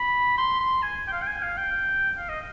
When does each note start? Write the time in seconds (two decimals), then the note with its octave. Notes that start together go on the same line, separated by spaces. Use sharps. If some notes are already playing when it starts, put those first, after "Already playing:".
Already playing: B5
0.38 C6
0.60 C6
0.83 G#5
1.08 G5
1.13 F5
1.22 G5
1.27 G#5
1.43 F5
1.58 G5
2.18 F5
2.29 D#5